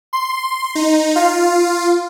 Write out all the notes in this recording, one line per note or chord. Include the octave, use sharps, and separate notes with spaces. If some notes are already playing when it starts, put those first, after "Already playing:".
C6
D#4
F4